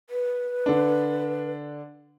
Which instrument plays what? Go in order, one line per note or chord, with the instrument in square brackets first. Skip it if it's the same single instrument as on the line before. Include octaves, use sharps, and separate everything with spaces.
[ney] B4
[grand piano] D3 D4